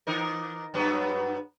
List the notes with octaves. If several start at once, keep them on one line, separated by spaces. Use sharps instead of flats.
E3 D#4 A#4
G2 F#3 B3